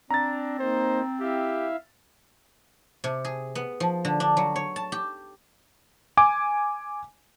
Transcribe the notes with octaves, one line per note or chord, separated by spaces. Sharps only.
C4 D4 A#5 A6
A#3 D#4 C5
E4 G4 E5 F5
C3
G#4
B3
F3
D3
D4
F#3
C#5
A5
G4
G#5 D6